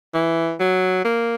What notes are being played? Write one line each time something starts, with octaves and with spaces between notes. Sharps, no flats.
E3
F#3
A#3